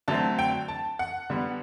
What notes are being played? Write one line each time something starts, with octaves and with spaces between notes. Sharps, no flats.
D3 F#3 A3 C4 A5
G5
A5
F#5
D3 G3 B3